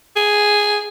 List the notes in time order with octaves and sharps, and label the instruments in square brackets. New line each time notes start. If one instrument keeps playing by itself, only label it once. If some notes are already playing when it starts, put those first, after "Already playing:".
[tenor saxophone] G#4